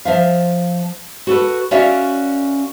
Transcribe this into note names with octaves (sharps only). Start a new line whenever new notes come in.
F3 E5 F5
F#4 A4 B4
C#4 F#4 A#4 D5 E5 F5